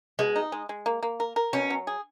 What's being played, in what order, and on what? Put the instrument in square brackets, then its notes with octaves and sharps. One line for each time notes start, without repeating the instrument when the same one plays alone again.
[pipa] B2 [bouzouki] G#3
[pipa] D#4
G#3
G#3
A#3
A#3
A#4
A#4
[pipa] B2 [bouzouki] C#4
[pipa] F#3
G#4